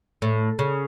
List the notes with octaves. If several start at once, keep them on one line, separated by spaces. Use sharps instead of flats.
A2
C#3